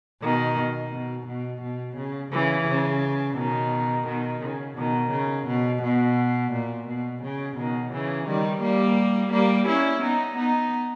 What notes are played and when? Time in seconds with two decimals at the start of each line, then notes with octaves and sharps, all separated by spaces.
0.21 B2 D#3
0.92 B2
1.26 B2
1.62 B2
1.96 C#3
2.32 C#3 E3
2.67 C#3
3.37 B2 D#3
4.06 B2 D#3
4.42 C#3
4.77 B2 D#3
5.11 C#3
5.47 B2
5.82 B2
6.52 A#2
6.87 B2
7.22 C#3
7.57 B2 D#3
7.92 C#3 E3
8.26 D#3 G3
8.61 G3 A#3
9.32 G3 A#3
9.67 C#4 E4
10.02 B3 D#4
10.36 B3 D#4